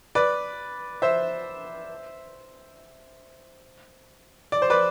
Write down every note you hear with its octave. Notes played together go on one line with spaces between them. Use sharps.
B4 D5
C5 E5
D5
C5
B4 D5